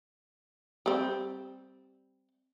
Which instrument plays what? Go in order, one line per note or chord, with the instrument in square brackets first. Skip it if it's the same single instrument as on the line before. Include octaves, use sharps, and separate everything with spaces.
[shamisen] G3 C4